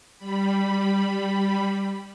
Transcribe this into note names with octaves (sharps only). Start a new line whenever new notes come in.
G3 B5